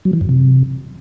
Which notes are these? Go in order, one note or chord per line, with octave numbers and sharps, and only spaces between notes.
F#3
E3
F#2
C3